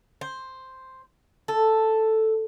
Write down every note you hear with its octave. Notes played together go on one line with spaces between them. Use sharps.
C5
A4